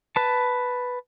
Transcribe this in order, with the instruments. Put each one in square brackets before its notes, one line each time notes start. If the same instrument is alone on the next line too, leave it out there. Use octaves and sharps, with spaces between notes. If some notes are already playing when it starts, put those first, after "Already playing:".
[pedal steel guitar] B4 A5